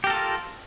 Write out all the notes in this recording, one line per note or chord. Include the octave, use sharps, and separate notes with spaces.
F4 G4 A4 A#4